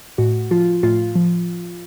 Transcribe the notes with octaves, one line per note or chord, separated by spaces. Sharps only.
A2 F#4
F3 F4
A2 F4
F3